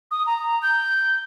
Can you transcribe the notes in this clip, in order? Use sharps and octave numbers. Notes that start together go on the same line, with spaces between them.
D#6
A#5
G6